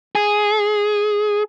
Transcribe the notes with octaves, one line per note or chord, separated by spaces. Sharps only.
G#4